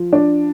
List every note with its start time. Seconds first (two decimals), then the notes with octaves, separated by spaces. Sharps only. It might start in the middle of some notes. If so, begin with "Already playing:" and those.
Already playing: F3
0.13 D4